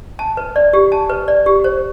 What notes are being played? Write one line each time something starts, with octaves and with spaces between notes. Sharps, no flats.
A5
B4
D5
G4
A5
B4
D5
G4
C5